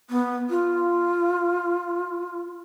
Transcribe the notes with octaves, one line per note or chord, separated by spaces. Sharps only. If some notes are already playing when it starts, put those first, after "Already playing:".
B3
F4